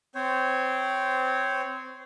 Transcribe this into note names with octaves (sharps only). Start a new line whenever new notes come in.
C4 C5 C#5